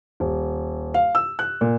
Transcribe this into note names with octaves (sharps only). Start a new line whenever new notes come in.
D#1
F5
E6
F#6
A#2